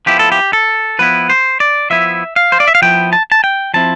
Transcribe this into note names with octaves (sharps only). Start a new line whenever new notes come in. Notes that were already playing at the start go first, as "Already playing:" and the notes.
F3 B3 E4 G4
A4
G4
A4
F3 B3 E4 B4
C5
D5
F3 B3 E4 E5
F5
C5
D5
E5
F5
F3 B3 E4 G5
A5
A5
G5
F3 C4 E4 A5